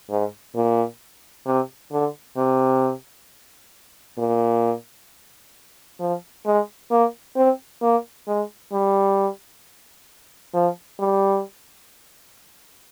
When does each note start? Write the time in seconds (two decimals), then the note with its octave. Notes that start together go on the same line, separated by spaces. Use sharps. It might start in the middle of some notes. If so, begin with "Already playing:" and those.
0.10 G#2
0.55 A#2
1.46 C3
1.92 D3
2.37 C3
4.18 A#2
6.00 F3
6.45 G#3
6.91 A#3
7.36 C4
7.82 A#3
8.28 G#3
8.72 G3
10.54 F3
11.00 G3